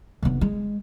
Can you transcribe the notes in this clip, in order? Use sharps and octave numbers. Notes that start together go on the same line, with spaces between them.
F1 B3
G#3